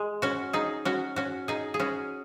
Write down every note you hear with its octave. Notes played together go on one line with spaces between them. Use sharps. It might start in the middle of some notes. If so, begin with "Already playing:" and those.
Already playing: G#3
C#4 F#4
D#4 G#4
C#4 F#4
C#4 F#4
D#4 G#4
G#4
C#4 F#4